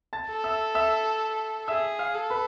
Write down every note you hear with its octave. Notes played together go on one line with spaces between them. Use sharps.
A5 A6
A4
E5 E6
E5 E6
G#4 E5 E6
F5 F6
A4
B4 B5